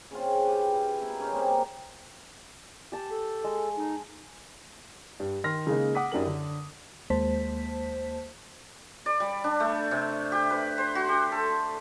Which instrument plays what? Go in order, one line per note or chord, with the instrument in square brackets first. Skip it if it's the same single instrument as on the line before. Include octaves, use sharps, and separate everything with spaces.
[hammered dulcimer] C#3 C4 F4
G4 B4
E4
B2 E4 A#5
C#4 D#4 G#4 A#4
G3 A#3 C4
[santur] G4 A5
[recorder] A4
[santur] G#3
[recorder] D#4
[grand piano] G2
D#3 C6 F6 A#6
C#3 G#3 A#3 D#4
F#5 D6 D#6 B6
F#2 D4 E4 G4 A#4 F#7
D3
[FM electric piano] D#2 G#3 A#3 C5 A5 B6
[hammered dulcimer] D5
G3
D4
A3
C3
G4
B4
C5
F#4
G4
A4